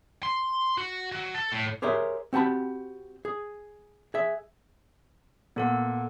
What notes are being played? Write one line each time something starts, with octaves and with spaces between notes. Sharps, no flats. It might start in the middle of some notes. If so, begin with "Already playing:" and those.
C6
F#4
F#3
A4
A2
G4 G#4 A#4 C5 C#5 E5
C4 F#4 G4 A5 B5
G#4
G#4 E5
A#2 B3 A4 F#5